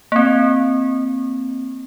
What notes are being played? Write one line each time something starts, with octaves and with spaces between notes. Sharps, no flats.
A#3 C4